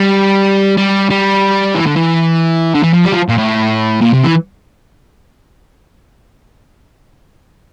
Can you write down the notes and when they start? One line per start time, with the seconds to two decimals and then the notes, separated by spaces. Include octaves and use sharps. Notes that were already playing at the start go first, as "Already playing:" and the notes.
Already playing: G3
0.77 G3
1.10 G3
1.75 E3
1.86 D3
1.96 E3
2.75 D3
2.83 E3
2.93 F3
3.05 G3
3.12 F3
3.28 A#2
3.37 A2
4.01 A#2
4.13 C3
4.24 E3